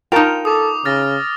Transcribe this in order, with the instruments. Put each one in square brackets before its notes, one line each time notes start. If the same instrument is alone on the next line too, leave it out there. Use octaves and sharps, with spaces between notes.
[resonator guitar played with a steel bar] D#4 G5 [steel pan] F4 A#4 A5 [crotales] F7
[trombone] A4 [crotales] D6 D#6
[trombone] C#3 [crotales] F6 A6 A#6